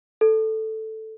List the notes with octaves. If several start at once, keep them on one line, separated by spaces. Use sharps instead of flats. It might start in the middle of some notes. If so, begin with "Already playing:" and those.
A4